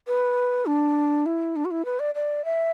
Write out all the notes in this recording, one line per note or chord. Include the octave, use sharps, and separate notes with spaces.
B4
D4
E4
D4
F#4
E4
B4
D5
D5
E5